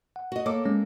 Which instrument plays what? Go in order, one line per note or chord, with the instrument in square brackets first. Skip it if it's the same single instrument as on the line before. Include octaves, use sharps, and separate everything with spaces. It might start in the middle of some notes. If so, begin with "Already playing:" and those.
[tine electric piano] F#5
[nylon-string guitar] F#4 D#5
[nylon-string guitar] A#3 A4 [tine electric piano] C#5 D6
[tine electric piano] G#3 C#4